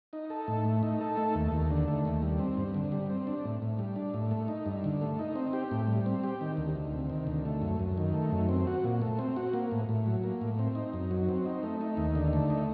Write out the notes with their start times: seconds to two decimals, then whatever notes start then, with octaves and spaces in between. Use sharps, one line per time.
0.13 D#4
0.30 A4
0.48 A2
0.65 A3
0.83 D#4
1.01 A4
1.17 A3
1.35 D#2
1.52 D#2
1.71 D3
1.88 A3
2.05 D#2
2.22 G3
2.39 C4
2.57 G2
2.74 D3
2.92 G3
3.10 C4
3.27 D4
3.45 A2
3.62 A2
3.79 G3
3.96 D4
4.14 A2
4.31 A3
4.48 D#4
4.66 G2
4.84 D3
5.01 A3
5.19 D#4
5.36 C4
5.53 G4
5.71 A2
5.88 G3
6.06 C4
6.24 G4
6.41 D#3
6.57 D2
6.76 D2
6.93 C3
7.10 D#3
7.27 D2
7.45 A3
7.62 F#2
7.79 F#2
7.97 D#3
8.14 A3
8.32 F#2
8.49 C4
8.67 F#4
8.84 A#2
9.02 A3
9.19 C4
9.36 F#4
9.54 A#3
9.72 A2
9.89 A2
10.06 F#3
10.24 A#3
10.41 A2
10.59 C4
10.75 D#4
10.93 F#2
11.11 F#3
11.29 C4
11.45 D#4
11.63 A3
11.81 D#4
11.97 D#2
12.15 D3
12.33 A3
12.50 D#4